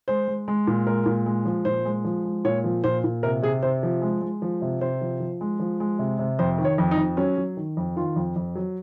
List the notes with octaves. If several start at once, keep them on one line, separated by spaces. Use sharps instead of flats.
G#3 C5
G#3
G#3
A#2
G#3 A#4
A#2
G#3
F3
A#2 C5
G#3
F3
G#3
A#2 C#5
F3
A#2 C5
A#2
C3 A#4
C3 G#4
C3 C5
F3
G#3
G#3
F3
C3
C3 C5
F3
F3
G#3
F3
G#3
C3
C3
F2 C5
D#3
C#5
F2
D#4
F2
F#3 C#4
F#3
D#3
F2
D#3 F4
F2
F2
F#3